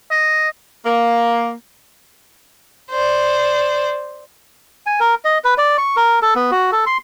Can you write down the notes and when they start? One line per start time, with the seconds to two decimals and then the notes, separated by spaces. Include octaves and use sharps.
0.11 D#5
0.86 A#3
2.91 C5 D5
4.86 G#5
5.00 A#4
5.25 D#5
5.44 B4
5.58 D5
5.78 C#6
5.96 A#4
6.22 A4
6.35 B3
6.51 F#4
6.72 A4
6.86 C6